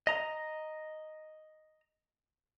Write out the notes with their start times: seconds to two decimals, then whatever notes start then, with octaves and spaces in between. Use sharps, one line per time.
0.07 D#5 A#5